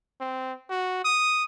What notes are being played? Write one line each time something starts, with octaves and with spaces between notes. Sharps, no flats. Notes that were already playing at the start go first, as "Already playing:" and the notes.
C4
F#4
D#6